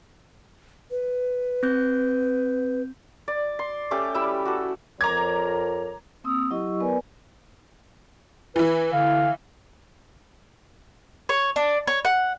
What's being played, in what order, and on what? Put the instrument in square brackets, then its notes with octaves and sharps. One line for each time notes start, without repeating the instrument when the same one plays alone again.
[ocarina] B4
[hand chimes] C4 G6
[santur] D5
C6
A3 C#4 G4 D6
G3 E4 E5
F#4 A4
[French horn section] F2 A#4 C#5 [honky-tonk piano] A#5 D6 G#6
[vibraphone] A#3 C4 D#6 E6
F#3 E4 G4 D#5 C#6 E6
B3 A#4 B4 D5 G#5
[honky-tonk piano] E3 E4 [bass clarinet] B4
[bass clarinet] D3 [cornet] F5
[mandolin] C#5
D4
C#5
F#5